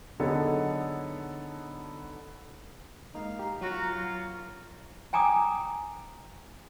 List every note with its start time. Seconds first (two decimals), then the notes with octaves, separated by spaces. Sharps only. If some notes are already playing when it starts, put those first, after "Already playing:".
0.20 D3 F#3 B3 D#4 G#4 A4
3.14 G#3 A#3 D#4 F5
3.39 G4 A#5
3.61 F#3 A#3 C#4 F4 F#4 A#5
3.91 F5
5.13 G5 G#5 A#5 D6 D#6